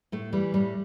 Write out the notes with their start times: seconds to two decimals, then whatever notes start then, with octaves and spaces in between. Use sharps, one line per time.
0.12 A2 A3
0.33 E3 G3
0.54 A2 G3